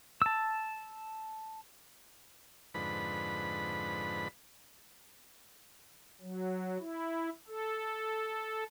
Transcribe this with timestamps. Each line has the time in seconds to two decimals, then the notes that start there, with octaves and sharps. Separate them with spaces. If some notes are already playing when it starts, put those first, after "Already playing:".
0.22 A5 E6
2.74 F2 G#2 D3 B4 B5
6.22 F#3
6.80 E4
7.48 A4